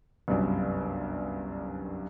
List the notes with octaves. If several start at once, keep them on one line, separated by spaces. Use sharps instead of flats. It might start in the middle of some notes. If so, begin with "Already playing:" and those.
G1 C2 F#2